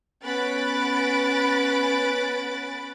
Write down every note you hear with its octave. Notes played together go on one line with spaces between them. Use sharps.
B3 C#4 B5 F#6 A6 D7